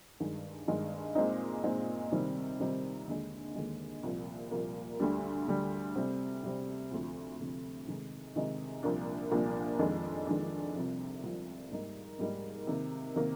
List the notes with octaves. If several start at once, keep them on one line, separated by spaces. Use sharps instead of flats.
G2 D#3 G#3
G2 D#3 G#3
A#2 G#3 C4 D#4
A#2 G#3 C4 D#4
C3 D#3 G3 C4 D#4
C3 D#3 G3 C4 D#4
D#2 D3 G#3
D#2 D3 G#3
C2 A#2 F3 A#3
C2 A#2 F3 A#3
D2 D3 G3
D2 D3 G3
C3 G3 C4
C3 G3 C4
D2 C3 F3
D2 C3 F3
C3 D#3 G#3 D#4
C3 D#3 G#3 D#4
C2 A#2 F3 A#3 D4
C2 A#2 F3 A#3 D4
F2 D#3 G#3 D4
F2 D#3 G#3 D4
C2 C3 F3
C2 C3 F3
G#2 G3 A#3 D#4
G#2 G3 A#3 D#4
C3 D#3 A#3
C3 D#3 A#3